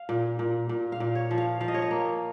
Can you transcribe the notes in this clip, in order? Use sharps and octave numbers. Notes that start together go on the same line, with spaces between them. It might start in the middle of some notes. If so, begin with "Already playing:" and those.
Already playing: F5
A#2
A#2
A#2
F5
A#2
C#5
F3
F5
F3 F5
D#5
C#5
D#5
A#3